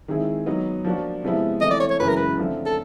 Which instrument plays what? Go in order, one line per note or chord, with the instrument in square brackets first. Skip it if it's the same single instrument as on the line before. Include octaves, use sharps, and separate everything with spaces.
[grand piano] D#3 G#3 C4 E4 G#4
F#3 B3 D#4
F3 A#3 D4 F#4
C3 F3 G#3 B3 E4
[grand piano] E3 A3 C4 [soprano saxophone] D#5
[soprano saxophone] D5
C#5
C#5
[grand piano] F#2 C#3 E3 G#3 [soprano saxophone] B4
[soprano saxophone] A#4
B4
[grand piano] D3 F3 A3 C4 E4
[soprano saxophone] A4